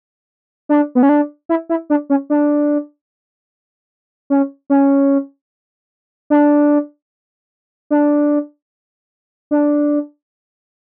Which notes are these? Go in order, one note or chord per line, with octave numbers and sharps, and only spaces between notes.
D4
B3
C#4
D4
E4
E4
D4
C#4
D4
C#4
C#4
D4
D4
D4